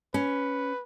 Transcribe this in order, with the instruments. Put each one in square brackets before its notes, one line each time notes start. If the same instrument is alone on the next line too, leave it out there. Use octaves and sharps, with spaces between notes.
[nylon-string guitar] C#4 [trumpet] B4